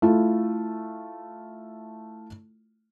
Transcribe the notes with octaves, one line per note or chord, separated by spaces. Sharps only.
A3 E4 F4